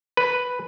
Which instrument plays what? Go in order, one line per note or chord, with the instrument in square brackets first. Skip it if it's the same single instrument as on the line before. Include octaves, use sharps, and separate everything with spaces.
[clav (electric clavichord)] B4